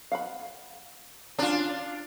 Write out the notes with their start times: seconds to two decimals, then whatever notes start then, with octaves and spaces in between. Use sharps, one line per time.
0.12 F5 F#5 B5
1.39 C#4 D4 F4 D5